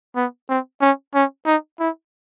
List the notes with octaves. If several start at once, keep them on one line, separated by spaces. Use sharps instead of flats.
B3
C4
C#4
C#4
D#4
E4